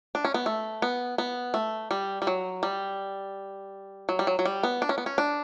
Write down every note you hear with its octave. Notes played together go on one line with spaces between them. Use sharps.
D4
C#4
B3
A3
B3
B3
A3
G3
G3
F#3
G3
F#3
G3
F#3
F#3
G3
B3
D4
C#4
B3
C#4
D4